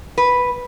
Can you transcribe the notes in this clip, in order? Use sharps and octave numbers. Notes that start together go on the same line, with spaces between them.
B4